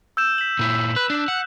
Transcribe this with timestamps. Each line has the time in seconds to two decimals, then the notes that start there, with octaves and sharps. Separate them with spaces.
0.17 E6 G6 E7
0.38 B6 F#7
0.59 A#2 E4
0.96 B4 F#6
1.10 D4
1.28 F#5